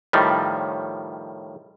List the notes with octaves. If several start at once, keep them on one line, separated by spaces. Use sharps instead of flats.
A2 D#3 F3 G3